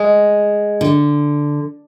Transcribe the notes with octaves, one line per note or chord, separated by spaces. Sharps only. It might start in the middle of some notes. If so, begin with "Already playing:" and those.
Already playing: G#3
D3